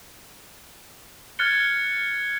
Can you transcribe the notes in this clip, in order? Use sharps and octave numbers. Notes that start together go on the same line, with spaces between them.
F6 F#6 G#6 A6 C#7 G7